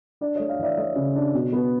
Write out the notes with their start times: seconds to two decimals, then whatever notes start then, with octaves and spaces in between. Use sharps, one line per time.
0.21 D4 D5
0.35 A3 C#5 D#5
0.49 D#5 F5
0.59 E3 D5 E5
0.78 A3 C#5 D#5
0.96 C#3
1.15 D4
1.34 B2
1.53 B3